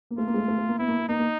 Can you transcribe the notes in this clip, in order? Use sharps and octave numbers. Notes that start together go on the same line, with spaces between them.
A#3
A3 F4
A#3
G#3
A3
A3
A3
A#3
B3 E4
A#3
A#3
A#3 D#4
A#3